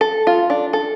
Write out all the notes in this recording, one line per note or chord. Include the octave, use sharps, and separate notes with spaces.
A4
F4
D4
A4